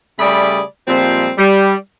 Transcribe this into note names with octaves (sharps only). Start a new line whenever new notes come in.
C#3 G3 A3 G#4 D5 B5
A#2 F3 G3 G#3 C4
G3